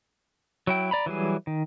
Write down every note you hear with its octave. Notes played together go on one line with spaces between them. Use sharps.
F#3 E4 G5
D5 A#5 B5
E3 F#3 G3 G#4
D#3